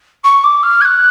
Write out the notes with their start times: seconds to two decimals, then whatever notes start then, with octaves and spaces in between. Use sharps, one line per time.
0.24 C#6
0.43 D6
0.63 F6
0.81 G#6
0.84 F#6